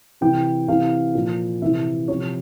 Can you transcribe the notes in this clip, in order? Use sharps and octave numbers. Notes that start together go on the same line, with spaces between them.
C3 E3 G5
C3 E3 F5
A#2 F3
C3 E3 E5
C3 F3 C#5